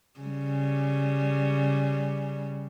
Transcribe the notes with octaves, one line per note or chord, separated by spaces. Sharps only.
C#3 G3